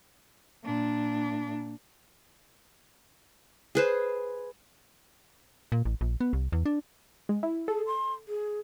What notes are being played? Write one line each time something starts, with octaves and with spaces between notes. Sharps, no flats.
A#2 D4
G#4 B4 C5
A#2
A1
A#1
B3
C2
E2
D4
G#3
E4
G#4 A4
C6
G#4